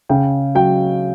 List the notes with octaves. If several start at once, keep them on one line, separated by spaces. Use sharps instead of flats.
C#3 G5
F#3 G5